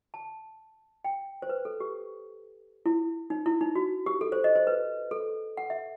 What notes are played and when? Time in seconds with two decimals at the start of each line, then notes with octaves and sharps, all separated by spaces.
0.14 A5
1.05 G5
1.42 C5
1.49 B4
1.65 A4
1.80 G4
2.86 E4
3.30 D#4
3.46 E4
3.61 D#4
3.75 F#4
4.06 G4
4.21 A4
4.32 C5
4.44 D#5
4.55 C5
4.67 B4
5.11 A4
5.57 F#5
5.70 E5